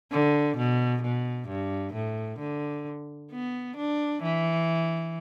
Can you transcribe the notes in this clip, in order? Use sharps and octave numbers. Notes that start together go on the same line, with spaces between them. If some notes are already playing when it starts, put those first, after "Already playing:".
D3
B2
B2
G2
A2
D3
B3
D4
E3